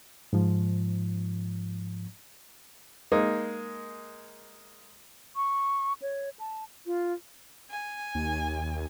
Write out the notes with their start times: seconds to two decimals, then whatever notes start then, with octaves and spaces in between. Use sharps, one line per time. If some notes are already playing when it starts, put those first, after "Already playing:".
0.33 G#2 F3
3.12 G#3 A#3 D#4
5.36 C#6
6.02 C#5
6.40 A5
6.86 F4
7.71 G#5
8.15 D#2